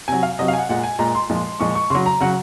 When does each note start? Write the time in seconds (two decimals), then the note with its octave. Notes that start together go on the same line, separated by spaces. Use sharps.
0.08 C3 F#3 G#5
0.23 F5
0.39 C3 F#3 D#5
0.48 F5
0.53 G#5
0.58 F#5
0.69 A#2 G#3 F#5
0.83 G#5
0.99 A#2 G#3 A#5
1.15 C6
1.30 A#2 F3 G#3
1.60 A#2 F3 G#3 C#6
1.75 C#6
1.90 C#3 F#3 C6
2.06 A#5
2.20 C#3 F#3 F#5